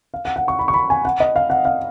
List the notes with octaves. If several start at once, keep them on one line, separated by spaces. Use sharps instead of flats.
F5
F#5
F#5
C#6
B5
C#6
B5
G#5
F#5
D#5
F5
F#5
F5